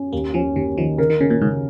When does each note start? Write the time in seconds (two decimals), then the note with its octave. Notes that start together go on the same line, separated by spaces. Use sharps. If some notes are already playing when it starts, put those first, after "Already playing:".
Already playing: C#4
0.13 D#2 A#3
0.34 F3 C#4
0.56 D#2 D#3
0.77 D#3 F3
0.98 C#3 A#4
1.10 D#3
1.20 C#3 C#4
1.30 A#2
1.41 G#2 C#3